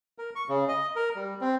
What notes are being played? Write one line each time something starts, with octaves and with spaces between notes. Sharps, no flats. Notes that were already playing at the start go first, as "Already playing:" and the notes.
A#4
C#6
C#3
D#5
A#4
G3
C4